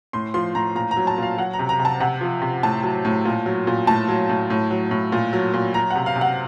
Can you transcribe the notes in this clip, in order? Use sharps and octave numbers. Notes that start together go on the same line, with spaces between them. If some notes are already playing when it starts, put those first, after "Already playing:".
A2 C6
F3 C6
A2 A#5
A#2 A#5
A#5
F#3
A5
A#2 F5
F#3 F#5
A#5
C3
A#5
C3
A5
C3 F#5
F3
C3
A2 A5
F#3
A2
A#2
F#3
A#2
A2 A5
F#3
A2
A2
F#3
A2
A#2
F#3
A#2
F#3 A#5
F#5
C3
F5
C3
F#5